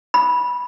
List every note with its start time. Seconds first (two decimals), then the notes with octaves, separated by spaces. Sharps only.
0.14 B5